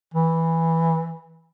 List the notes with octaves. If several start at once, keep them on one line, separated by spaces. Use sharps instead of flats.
E3